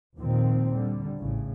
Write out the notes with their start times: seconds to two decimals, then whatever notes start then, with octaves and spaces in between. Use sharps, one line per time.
0.17 D#2 A#2 D#3 F3 C4
0.72 D3 G3
1.18 A1 A2 C#3